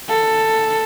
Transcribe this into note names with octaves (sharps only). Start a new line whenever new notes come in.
A4